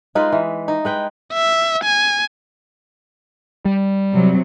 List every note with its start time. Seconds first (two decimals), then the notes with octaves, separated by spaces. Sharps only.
0.15 G#3 D#4 F4 B4
0.32 E3
0.68 D#4
0.85 G#3 B4 G5
1.33 E5
1.83 G#5
3.65 G3
4.13 C3 F#3